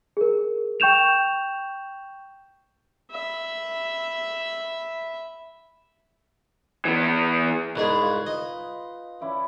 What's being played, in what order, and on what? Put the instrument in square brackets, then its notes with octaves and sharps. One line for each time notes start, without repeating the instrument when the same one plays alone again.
[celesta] G#4 A#4
G5 C#6 G6 E7 F7
[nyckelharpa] E5 B5
[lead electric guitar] E3 B3
[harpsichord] C2 G#2 G#4 [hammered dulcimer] D#4 B4
[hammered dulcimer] F4
[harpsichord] D#5
[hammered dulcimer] C#4 E4 D5